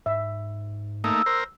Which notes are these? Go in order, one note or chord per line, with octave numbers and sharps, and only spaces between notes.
G#2 E5
A3 A#3 D#4 E6
A#4 C5